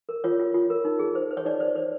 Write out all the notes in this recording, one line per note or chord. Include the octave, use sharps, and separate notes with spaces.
A#4
F4 C#5
F4
F4
A#4
D#4
G#4
C5
C5
C#5
D#4 D5
C5
C5